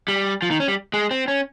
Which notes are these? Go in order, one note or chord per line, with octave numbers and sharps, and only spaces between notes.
G3
F3
D#3
C#4
G3
G#3
C4
C#4